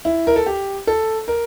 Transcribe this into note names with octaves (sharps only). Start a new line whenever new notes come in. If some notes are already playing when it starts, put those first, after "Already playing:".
E4
A#4
A4
G4
A4
A#4